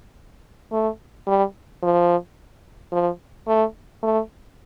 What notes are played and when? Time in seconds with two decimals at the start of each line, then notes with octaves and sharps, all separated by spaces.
0.72 A3
1.27 G3
1.83 F3
2.92 F3
3.48 A3
4.03 A3